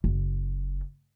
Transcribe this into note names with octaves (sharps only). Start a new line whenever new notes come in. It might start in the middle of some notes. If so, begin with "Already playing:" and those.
F#1